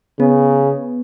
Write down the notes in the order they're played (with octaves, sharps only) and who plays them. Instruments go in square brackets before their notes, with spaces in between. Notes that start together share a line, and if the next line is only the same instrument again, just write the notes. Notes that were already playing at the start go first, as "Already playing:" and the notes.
[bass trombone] C#3 [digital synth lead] B3